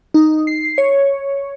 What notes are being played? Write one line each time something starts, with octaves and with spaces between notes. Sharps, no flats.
D#4
C7
C#5